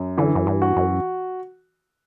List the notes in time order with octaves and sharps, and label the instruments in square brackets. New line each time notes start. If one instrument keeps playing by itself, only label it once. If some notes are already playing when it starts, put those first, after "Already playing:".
Already playing: [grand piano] F#2
[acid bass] D3 [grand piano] E3
[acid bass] F#2
G2
[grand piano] F#4
[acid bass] F#2